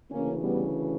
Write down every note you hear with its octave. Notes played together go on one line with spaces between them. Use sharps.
D2 C#3 E3 A#3 C#4
G3 B3